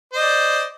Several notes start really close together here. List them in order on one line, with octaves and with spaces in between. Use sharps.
C5 D#5 D5